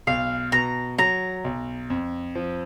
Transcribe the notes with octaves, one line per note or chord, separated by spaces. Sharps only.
B1 F5
B2 A#5
F#3 A#5
B1
F2
F3